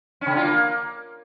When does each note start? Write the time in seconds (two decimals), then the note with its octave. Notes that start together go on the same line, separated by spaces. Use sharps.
0.21 C#4
0.26 C#3
0.32 D3
0.37 F4
0.42 A#3